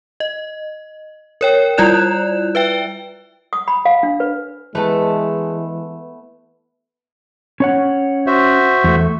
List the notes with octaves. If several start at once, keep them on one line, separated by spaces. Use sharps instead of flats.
D#5
A#4 C#5 G5
G3 E4 F4 D5 F#6 E7
B4 E5 G5
D#6
B5
F5
D4
B4
E3 G#3 A3 B3 B4 A5
C#4 C#5 F#5
F#4 C5 E5
E2 A3